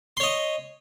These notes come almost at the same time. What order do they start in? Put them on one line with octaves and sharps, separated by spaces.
C6 C#5 D#5